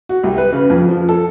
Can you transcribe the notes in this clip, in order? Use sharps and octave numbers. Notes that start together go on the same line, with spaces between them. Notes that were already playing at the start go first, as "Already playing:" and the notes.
F#4
C2
B4
C#3
F2
F3
A4